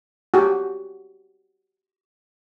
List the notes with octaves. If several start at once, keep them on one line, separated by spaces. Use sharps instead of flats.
F#4 G4